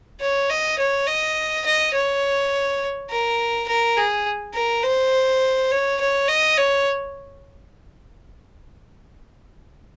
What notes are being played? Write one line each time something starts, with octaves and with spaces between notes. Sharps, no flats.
C#5
D#5
C#5
D#5
D#5
C#5
A#4
A#4
G#4
A#4
C5
C#5
C#5
D#5
C#5